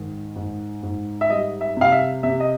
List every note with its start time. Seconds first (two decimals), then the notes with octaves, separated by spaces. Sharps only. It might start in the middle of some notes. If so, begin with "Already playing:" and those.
Already playing: G#2 D#3
0.36 G#2
0.83 G#2
1.21 E5
1.30 G3 D#5
1.61 E5
1.76 C3 F5
1.92 E5
2.23 C3 E5
2.40 D#5